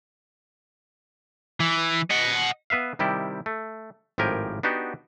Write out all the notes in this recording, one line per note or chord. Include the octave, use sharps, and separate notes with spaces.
E3
D#5 F#5
B3 B4 E5 F5
C3 D#3 G3 E4 G4
A3
G#1 A2 F3 G4 A#4 G#5
B3 D4 D#4 F#4 G4